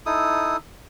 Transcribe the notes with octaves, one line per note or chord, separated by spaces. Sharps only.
D#4 E4 A4 D#6